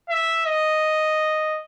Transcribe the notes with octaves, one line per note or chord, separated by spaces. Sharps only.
E5
D#5